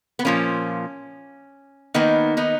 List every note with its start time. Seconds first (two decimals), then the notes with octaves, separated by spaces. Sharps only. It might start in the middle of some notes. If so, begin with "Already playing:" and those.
0.19 B3
0.25 A#2 F3 A#3 C#4
1.94 D#3 A#3 B3 D#4
2.37 B3 D#4